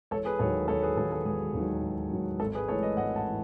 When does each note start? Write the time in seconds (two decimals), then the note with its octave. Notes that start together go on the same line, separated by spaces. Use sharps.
0.11 E1 A4 C#5
0.25 G#4 B4
0.39 D#2 D#3 F#3 A4 C#5
0.68 E1 A4 C#5
0.82 G#4 B4
0.97 D#2 D#3 F#3 A4
1.12 A4
1.25 E1 G#4
1.54 D#2 D#3 F#3
1.83 E1
2.12 D#2 D#3 F#3
2.40 G#1 A4
2.55 G#4 B4
2.68 G#2 E3 A3 A4 C#5
2.83 B4 D#5
2.97 G#1 D#5 F#5
3.16 F#5 A5
3.29 E3